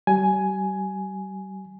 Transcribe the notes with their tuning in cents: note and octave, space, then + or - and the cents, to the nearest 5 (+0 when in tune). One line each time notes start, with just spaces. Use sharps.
G3 -40 G#5 +10